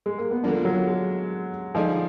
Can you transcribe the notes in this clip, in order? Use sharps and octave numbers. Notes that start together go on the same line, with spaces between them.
G#3
A#3
B3
D3 F3 A#3 D4
F#3
G#3
D3 F3 G#3 D#4 G#4 D5